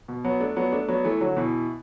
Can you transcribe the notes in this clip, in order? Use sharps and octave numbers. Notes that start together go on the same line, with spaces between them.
B2
F#3 B3
A3 D4
F#3 B3
A3 D4
F#3 B3
E3 A3
D3 F#3
B2 E3